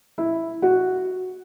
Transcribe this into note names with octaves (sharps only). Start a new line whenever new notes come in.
E4
F#4